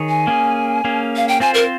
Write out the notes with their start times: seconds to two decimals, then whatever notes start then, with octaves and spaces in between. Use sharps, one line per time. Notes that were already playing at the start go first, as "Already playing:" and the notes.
Already playing: D#3 G#4 C#5
0.09 G#5
0.27 A#3 C#4 G#4
0.84 A#3 C#4 G#4
1.16 F5
1.28 G5
1.40 C4 F4 C5 G#5
1.54 A#4